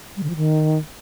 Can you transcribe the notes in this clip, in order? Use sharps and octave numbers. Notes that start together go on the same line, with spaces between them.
G3
D3
F3
D#3